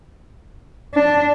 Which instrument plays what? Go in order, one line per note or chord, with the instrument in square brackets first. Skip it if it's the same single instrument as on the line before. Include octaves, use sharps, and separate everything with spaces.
[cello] D4